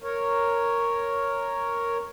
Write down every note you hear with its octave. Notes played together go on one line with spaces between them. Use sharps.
A#4 C#5